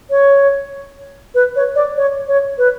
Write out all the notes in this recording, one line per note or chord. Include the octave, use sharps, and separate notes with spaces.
C#5
B4
C#5
D5
C#5
C#5
B4